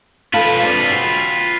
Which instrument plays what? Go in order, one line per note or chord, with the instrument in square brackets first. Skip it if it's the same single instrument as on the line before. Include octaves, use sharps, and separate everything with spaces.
[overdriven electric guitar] F4 B4 [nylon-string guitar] A4 F5
[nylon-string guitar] G3 C4 D4
F#4 G5